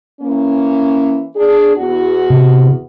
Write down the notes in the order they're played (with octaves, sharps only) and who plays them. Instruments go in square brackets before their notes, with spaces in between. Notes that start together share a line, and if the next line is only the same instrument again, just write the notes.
[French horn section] E3 A#3 C#4
D4 G#4
E2 F#4
[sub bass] C3